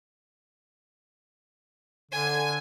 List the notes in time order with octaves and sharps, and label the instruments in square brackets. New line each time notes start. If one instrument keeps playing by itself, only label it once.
[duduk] D3 [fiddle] G#5